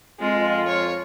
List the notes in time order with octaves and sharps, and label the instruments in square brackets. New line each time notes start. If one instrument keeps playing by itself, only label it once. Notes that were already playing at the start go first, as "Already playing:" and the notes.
[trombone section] F2 [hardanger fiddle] G#3 [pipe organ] F4
[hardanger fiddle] C#5